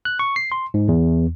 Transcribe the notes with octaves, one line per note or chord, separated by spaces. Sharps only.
F#6
C#6
C7
C6
G#2
E2